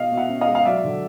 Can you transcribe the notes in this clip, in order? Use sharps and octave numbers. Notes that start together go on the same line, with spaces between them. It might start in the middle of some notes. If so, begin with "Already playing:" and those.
Already playing: B2 D#5 F5
B2
E5 F#5
C#4
D#5 F5
G#3
F5
F#3 D5 E5
D3